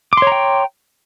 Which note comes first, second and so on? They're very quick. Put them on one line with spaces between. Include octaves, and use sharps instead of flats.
D6 C6 C#5 A#5 G5